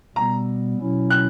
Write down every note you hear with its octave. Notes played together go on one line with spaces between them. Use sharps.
B2 G3 B3 A#5
B2 F#3 C#4 E4
F#6